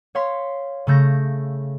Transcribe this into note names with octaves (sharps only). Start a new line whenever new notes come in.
C#5 F5 C6 B6
C#3 A3 G6 A#6